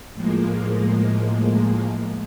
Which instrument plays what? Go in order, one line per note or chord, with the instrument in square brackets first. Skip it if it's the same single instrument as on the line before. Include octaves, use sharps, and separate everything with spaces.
[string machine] A2 F3 G#3 A#3